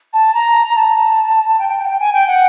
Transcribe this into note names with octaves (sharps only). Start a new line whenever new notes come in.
A5
A#5
A5
G5
G5
G5
F#5
G5
G#5
G5
F#5